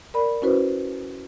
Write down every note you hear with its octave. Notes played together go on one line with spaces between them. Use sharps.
A#4 D5 B5
C#4 E4 F#4 B4 C5